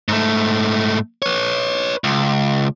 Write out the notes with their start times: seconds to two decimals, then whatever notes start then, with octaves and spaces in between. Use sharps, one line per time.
0.08 G#2 A3
1.22 B4 C#5
2.04 C#2